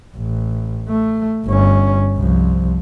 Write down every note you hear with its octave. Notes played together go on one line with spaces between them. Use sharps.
A1
A3
G1 C#4
C2 F3